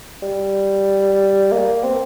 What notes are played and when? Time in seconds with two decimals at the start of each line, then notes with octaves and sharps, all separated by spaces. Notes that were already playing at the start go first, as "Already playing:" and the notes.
0.22 G3
1.52 A#3
1.84 C4